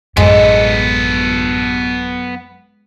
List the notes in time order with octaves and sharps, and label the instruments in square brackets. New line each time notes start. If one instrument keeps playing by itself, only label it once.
[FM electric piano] A1 [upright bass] F#2 [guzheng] G#3 [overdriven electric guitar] B3 A4